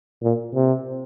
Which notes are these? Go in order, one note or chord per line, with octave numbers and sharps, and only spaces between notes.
A#2
C3